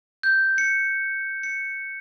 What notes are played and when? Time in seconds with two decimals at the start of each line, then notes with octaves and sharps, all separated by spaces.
0.23 G6
0.58 C#7
1.43 C#7